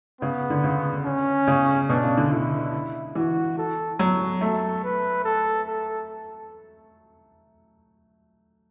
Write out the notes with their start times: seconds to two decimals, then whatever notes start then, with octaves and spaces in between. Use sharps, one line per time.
0.21 C#3 B3
0.50 D3
0.64 C#3
1.05 C#4
1.47 C#3
1.89 B2 D4
2.03 C#3
2.17 D3
2.31 D3 E4
3.15 E3 F#4
3.58 A4
3.99 F#3
4.41 A3 A4
4.84 B4
5.24 A4
5.67 A4